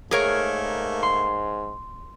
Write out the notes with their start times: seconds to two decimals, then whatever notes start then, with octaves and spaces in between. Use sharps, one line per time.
0.11 G#2 A3 A#3 G#4 A#4 C#5
1.03 C6